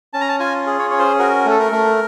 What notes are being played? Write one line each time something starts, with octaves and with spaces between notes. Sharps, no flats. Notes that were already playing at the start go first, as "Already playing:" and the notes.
C#4 A5
A#5
A5
F4 G#5
G#4
C#5
C#4 C#5
C5
F#4 A#4
A3 A4
A#4
A3